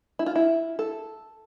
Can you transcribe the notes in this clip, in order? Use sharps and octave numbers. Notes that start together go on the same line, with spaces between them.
E4
F4
E4
A4